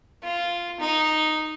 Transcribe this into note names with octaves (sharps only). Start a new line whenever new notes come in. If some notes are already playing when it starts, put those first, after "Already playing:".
F4
D#4